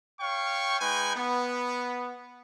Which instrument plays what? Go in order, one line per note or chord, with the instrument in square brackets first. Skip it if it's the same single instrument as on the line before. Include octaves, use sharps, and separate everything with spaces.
[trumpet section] C#5 F5 G5 C#6
G#3 D#4 B4 G5 G#5
B3